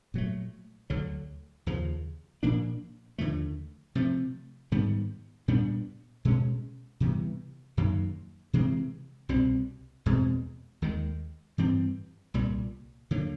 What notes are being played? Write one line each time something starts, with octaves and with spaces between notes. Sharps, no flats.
A#2 F#3 A3
D2 D3 F#3
D#2 C#3 F3
A#2 F3 A#3 D4
D#2 D3 F3 A3
C3 F3 A3
G#2 D#3 G3 B3
A#2 G3 B3 D4
B2 G#3 C#4
C3 E3 G3 B3
F#2 D#3 F#3 A#3
C3 E3 G#3 C4
C2 B2 G3 C4
E2 B2 G#3 C4
D#2 D#3 G#3
G2 E3 G3 C4
C2 A#2 G3
D2 D3 F#3 A#3